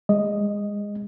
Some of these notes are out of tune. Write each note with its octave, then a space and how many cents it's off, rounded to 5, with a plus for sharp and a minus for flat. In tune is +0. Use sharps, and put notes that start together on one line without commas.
G#3 -25 D#5 +0